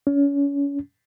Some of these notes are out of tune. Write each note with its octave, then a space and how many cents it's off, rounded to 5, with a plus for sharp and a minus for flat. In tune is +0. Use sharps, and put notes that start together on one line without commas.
C#4 +30